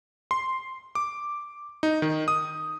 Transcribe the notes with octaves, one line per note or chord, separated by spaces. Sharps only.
C6
D6
D#4
D#3
D#6